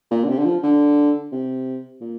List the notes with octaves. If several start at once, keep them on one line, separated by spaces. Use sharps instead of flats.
A#2
D3
C3
D3
F3
D3
C3
A#2